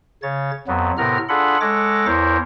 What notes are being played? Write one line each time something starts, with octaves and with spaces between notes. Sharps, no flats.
C#3 C#5 A6
F2 F#3 B3
A2 C3 B3 A#4 A#5 F6
D4 F4 G#4 A4 F#5 B5
G#3 A4 C#5 F#5 D6 A#6
E2 E4 A#4 C5 C#5